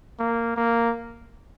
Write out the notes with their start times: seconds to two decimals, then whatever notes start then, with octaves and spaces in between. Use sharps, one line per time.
0.19 A#3
0.57 A#3